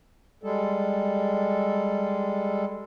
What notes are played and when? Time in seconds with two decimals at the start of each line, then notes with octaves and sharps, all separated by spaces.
0.43 G3 G#3 A4